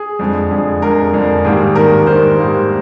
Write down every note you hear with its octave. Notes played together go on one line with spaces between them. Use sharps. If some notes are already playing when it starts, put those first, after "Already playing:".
Already playing: G#4
F2 D3 G#3
F2 D3 G#3
F2 D3 G#3 A#4
F2 D3 G#3
G#2 D#3 G3 A#3 G#4
G#2 D#3 G3 A#3 A#4
G#2 D#3 G3 A#3 C5
G#2 D#3 G3 A#3